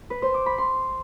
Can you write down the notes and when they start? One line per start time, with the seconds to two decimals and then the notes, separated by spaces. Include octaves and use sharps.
0.10 B4
0.22 C5
0.34 D6
0.46 B5
0.58 C6